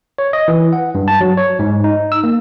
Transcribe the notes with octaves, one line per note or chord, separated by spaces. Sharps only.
C#5
D#5
E3
F#5
G2
A5
F#3
C#5
G#2
D#4
E6
A#3